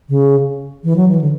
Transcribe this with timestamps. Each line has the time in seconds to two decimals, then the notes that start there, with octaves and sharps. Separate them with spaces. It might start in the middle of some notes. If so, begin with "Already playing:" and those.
0.09 C#3
0.84 E3
0.96 F#3
1.08 E3
1.21 D3